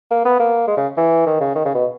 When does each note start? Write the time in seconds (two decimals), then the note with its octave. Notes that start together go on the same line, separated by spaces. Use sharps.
0.11 A#3
0.25 B3
0.39 A#3
0.68 G#3
0.77 C#3
0.97 E3
1.26 D#3
1.40 C#3
1.55 D#3
1.65 C#3
1.75 B2